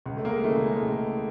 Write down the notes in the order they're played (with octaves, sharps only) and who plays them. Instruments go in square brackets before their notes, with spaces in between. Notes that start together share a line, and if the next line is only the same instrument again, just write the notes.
[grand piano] C#2
A3
G#3 A#3
C#3 E3 A3
G#3
C#2